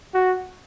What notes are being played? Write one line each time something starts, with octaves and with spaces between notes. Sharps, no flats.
F#4